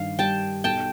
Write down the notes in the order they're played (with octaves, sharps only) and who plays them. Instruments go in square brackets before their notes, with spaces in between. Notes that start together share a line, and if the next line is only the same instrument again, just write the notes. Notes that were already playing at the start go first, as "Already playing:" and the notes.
Already playing: [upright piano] G2 D#3 [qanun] F5
[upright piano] G3 [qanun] G5 A5
[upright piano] B1 [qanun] G5 A5